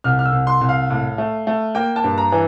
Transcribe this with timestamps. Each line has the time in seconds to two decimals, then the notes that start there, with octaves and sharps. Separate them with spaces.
0.04 C2 F6
0.19 F6
0.26 E6
0.32 C2
0.47 C6
0.61 C2
0.69 F5
0.90 A2
1.18 A3
1.47 A3
1.75 A#3 G5
1.96 A5
2.04 G2
2.18 A#5
2.32 E3